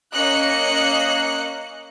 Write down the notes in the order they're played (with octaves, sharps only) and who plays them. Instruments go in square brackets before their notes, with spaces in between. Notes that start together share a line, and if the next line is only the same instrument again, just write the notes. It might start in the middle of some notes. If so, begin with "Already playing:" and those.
[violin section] A#3 C#4 D#5 F#6 C#7